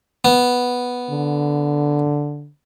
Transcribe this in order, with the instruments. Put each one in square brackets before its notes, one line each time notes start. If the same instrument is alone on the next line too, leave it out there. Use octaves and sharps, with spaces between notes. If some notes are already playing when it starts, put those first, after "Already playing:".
[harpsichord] B3
[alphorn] D3